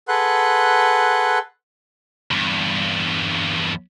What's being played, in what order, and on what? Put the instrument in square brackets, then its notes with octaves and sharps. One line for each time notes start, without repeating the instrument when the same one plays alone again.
[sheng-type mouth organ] G#4 A4 B4 F#5 C6 F#6
[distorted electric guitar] E2 G2